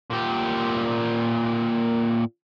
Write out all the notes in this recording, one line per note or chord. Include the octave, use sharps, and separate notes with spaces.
A#2 G4